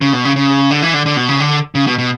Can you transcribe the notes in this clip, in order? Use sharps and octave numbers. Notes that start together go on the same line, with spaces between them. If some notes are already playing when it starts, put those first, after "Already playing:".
C#3
B2
C#3
C#3
D3
E3
D3
D3
B2
C#3
D3
C#3
B2
B2